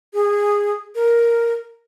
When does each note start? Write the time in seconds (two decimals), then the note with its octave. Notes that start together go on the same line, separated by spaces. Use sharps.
0.14 G#4
0.95 A#4